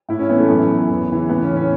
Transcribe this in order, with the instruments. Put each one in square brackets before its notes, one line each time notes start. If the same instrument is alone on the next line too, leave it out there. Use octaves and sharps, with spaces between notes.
[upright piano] A2 E4
C#4
E3 B3
A3
F#2 B3
E3
E2
C#3 E3
A2 B3
C#4
E3
C#4